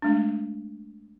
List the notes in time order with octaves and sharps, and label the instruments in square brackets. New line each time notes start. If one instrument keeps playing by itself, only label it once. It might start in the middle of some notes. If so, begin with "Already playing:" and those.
[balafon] G#3 A3 D4